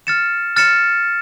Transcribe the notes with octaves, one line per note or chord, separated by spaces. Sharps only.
F6 A6 C#7 E7
F6 A6 C#7 E7